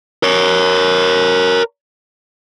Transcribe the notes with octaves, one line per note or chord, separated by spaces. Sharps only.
A#4 C#5